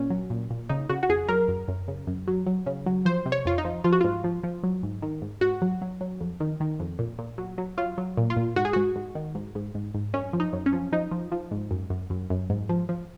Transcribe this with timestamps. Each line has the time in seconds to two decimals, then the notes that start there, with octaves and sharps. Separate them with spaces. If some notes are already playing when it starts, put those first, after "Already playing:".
Already playing: A#2 C#4
0.10 F#3
0.30 A#2
0.50 A#2
0.69 C#3 D#4
0.89 C#3 F#4
1.03 F#4
1.09 F2 G#4
1.28 F#3 A#4
1.48 F#2
1.68 F#2
1.88 C#3
2.07 F#2
2.27 F#3
2.46 F#3
2.66 C#3
2.86 F#3
3.05 F3 C5
3.26 C3
3.32 C#5
3.45 F2 F4
3.58 D#4
3.65 F3
3.84 F3 F4
3.92 F#4
4.01 G#2 F4
4.24 F3
4.44 F3
4.63 F#3
4.83 G#2
5.02 D#3
5.22 G#2
5.41 G#2 F#4
5.62 F#3
5.82 F#3
6.01 F#3
6.20 F2
6.40 D#3
6.60 D#3
6.80 F2
6.99 A#2
7.19 A#2
7.38 F#3
7.58 F#3
7.77 F#3 F4
7.98 F#3
8.17 A#2
8.30 F4
8.37 A#2
8.56 G#2 F#4
8.65 G#4
8.73 G#2 F#4
8.96 G#2
9.15 D#3
9.35 G#2
9.55 G#2
9.75 G#2
9.94 G#2
10.13 F#2 C#4
10.33 F3
10.40 D#4
10.53 F#2
10.66 C#4
10.73 F3
10.92 F3 D#4
11.11 F3
11.32 F3
11.51 G#2
11.71 F#2
11.90 F#2
12.10 F#2
12.30 F#2
12.50 G#2
12.69 F3
12.89 F3